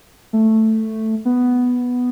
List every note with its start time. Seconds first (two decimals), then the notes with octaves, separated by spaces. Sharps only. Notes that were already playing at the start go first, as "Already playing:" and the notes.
0.33 A3
1.25 B3